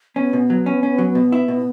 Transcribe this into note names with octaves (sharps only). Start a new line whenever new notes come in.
B3 C#4
B2
F#3
C#4
C#4
F#3
B2
E4
B2